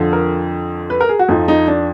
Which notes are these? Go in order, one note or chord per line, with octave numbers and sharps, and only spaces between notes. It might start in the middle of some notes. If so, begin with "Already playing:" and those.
Already playing: F2 D3 F3
A#4
B4
A#4
G#4
F#4
F2 F3 D#4
D#4
D4